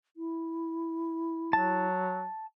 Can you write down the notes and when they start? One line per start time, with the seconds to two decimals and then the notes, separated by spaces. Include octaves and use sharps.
0.17 E4
1.53 F#3 A5